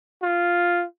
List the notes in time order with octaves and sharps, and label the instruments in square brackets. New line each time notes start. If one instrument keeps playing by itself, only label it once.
[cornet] F4